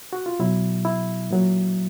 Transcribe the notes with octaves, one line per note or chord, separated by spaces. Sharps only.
F#4
F4
B2 F#3 E4
E4
A#2 F#3